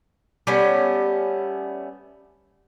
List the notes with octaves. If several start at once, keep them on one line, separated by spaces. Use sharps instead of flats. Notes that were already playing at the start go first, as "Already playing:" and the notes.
G3 A3 B3 C#4